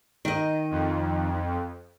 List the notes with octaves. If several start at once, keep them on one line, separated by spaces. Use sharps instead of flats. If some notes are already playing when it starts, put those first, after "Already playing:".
D#3 D#5
F2